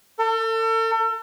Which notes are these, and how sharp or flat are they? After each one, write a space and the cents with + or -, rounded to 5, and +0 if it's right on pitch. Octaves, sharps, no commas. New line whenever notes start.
A4 +40